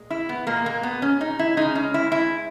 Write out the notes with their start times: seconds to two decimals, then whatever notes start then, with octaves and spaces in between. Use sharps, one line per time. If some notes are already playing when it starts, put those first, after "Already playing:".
Already playing: A#2 G#3
0.10 E4
0.29 B3
0.47 A#2 G#3 A#3
0.66 A#3
0.83 B3
1.02 C#4
1.21 D#4
1.39 E4
1.57 C#3 G#3 D#4
1.75 C#4
1.94 E4
2.12 E4